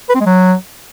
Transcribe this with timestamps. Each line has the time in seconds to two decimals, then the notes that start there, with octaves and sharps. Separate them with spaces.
0.09 B4
0.15 C4
0.20 G#3
0.26 F#3